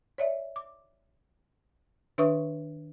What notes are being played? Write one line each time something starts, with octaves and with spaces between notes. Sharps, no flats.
C#5 D5 E5
D6
D#3 D4 B4 E5 C#6 D#6